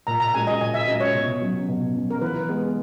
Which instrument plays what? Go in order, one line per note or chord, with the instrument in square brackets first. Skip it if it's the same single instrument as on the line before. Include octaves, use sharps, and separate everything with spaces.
[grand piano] A#2 [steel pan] A#5
[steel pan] A#5
[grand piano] G#3 C#4 F#4 [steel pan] G#5
[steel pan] D#5
[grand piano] A#2 [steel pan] G#5
[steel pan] E5
[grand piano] G#3 C#4 F#4 [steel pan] D#5
[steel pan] C#5
[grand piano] B2
F#3 C#4
B2
F#3 C#4
[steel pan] A#4
[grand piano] E3 [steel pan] B4
[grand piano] G#3 B3